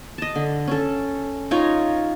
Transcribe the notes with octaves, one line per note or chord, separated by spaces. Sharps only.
D#5 A5
D3
C#4 A4
D#4 F4 C#5 A#5